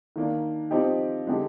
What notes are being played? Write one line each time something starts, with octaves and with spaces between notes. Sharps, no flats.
D#3 A#3 D4
F3 C4 D#4 G4
D3 G#3 D#4 G4